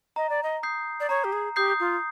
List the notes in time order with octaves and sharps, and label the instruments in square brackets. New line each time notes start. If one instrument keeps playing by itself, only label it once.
[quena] D#5 [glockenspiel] A#5
[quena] D5
D#5
[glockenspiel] D#6 G6 C7
[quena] D5
[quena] C#5 [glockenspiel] A#5
[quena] G4
G#4
[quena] G4 [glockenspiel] D#6 G6 C7
[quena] F4